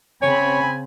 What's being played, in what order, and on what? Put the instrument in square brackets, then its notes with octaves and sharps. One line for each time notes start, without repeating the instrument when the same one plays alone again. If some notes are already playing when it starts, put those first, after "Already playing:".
[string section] C#3 C4 B5 [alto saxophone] C#5 [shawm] G#5